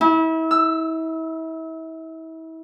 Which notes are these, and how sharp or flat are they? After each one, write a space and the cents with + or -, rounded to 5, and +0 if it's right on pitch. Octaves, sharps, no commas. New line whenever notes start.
E4 -35
E6 +10